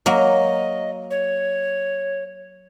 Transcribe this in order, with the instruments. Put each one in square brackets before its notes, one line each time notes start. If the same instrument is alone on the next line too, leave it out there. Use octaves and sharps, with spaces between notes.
[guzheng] F#3 A#3 [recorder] D#5
[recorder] C#5